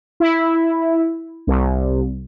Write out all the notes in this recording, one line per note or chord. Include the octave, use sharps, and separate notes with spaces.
E4
C2